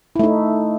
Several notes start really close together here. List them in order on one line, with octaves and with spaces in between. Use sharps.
E4 A3 D#4